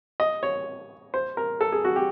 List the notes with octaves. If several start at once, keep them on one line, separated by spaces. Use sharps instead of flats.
D#5
C#5
C5
A#4
A4
G#4
F#4
G4